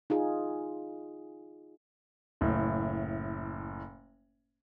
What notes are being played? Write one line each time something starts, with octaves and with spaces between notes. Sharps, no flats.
D#4 F4 G#4
F#1 A2